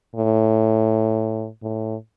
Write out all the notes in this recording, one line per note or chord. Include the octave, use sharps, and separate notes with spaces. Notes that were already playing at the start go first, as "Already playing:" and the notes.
A2
A2